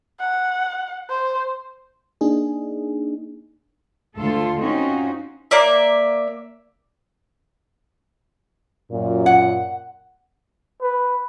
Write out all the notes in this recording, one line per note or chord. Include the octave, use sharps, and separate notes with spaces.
F#5
C5
A#3 D4 D#4 G#4
D2 F4 A4
C4 C#4 D#4 F4 F#4
A#3 D5 E5
F#2 A#2
F#5
B4